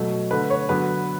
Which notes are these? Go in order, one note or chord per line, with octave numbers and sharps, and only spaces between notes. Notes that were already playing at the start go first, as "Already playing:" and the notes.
Already playing: B2 F#3 A3
D3 A3 B4
C#5
D3 F#3 B3 B4